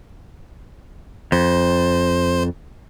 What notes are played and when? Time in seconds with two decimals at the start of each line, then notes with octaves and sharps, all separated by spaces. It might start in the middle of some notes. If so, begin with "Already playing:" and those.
1.32 F2 C5